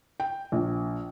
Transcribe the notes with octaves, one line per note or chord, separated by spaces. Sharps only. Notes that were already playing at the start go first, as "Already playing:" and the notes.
G5
A#1